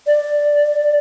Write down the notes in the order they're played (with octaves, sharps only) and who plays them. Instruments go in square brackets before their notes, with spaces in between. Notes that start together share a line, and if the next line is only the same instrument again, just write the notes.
[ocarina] D5